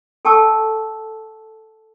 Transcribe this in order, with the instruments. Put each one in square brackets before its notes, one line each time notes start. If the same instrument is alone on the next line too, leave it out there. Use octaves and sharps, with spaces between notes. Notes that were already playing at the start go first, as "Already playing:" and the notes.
[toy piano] A4 G5 A5 C#6 E6